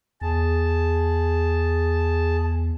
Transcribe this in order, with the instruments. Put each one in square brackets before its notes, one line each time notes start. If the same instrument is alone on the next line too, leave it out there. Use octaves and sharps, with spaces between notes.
[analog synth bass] E2 [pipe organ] G#4 A5